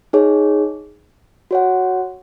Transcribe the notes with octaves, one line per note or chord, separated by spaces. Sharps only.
D#4 G#4 C#5
F#4 C#5 F#5